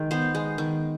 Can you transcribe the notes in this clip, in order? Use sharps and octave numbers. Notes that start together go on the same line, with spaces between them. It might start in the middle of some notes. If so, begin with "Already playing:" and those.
Already playing: D#3 G#3
B3 C5
G#3
D#3